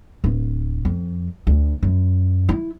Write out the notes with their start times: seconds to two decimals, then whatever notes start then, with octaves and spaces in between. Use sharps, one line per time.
0.24 D1
0.85 F2
1.47 D2
1.83 F#2
2.49 E4